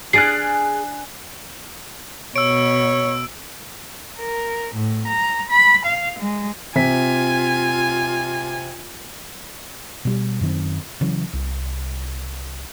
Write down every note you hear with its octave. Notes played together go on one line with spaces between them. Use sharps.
D4 G#4 G#5 F6 F#6 A6 C7 D7
B2 C#5 E6 D7
A#4
A2
A#5
B5
F5
G#3
C3 F4 G#5 B6
B2 G3
F#2 D#3 C4
C#3 E3 F#3
C2